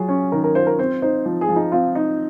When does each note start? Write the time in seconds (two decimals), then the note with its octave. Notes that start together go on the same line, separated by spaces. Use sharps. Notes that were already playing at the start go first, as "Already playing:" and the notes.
Already playing: F#3 F4 G#4
0.09 C#4
0.32 D#3 A#4
0.44 A#4
0.55 F4 C5
0.67 A#4
0.79 C4 C5
1.02 D#4 C5
1.26 F3
1.41 G#4
1.49 F3
1.56 D#4
1.72 C4 F4
1.95 D#4